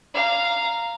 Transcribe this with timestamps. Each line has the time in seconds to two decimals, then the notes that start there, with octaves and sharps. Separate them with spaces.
0.14 F5 A#5